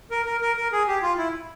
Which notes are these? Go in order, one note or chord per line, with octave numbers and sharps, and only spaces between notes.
A#4
A#4
A#4
A#4
G#4
G4
F4
E4